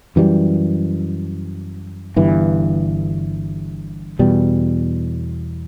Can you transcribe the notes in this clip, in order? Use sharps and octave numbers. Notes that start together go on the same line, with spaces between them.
F#2 E3 G3
G1 G2 E3
E2 B2 G3